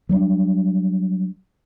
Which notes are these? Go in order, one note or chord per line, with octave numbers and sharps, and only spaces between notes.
F#3 G3 B3 D4